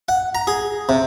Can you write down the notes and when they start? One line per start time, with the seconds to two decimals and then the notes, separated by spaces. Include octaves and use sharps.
0.09 F#5
0.35 A#5
0.47 G#4
0.89 C3